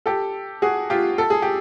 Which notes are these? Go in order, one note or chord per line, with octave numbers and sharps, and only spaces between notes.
G4 A4
F#4 G#4
F4 G4
A4
G#4
G4